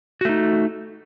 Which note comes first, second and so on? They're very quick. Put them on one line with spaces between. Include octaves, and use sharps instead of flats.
F#4 A3 D#4